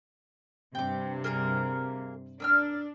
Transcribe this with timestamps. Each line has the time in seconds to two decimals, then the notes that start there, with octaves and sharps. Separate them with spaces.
0.75 G2 C3 G5 D6
1.24 A#3 G#4 A#4
2.40 D4 A#4 E6 F6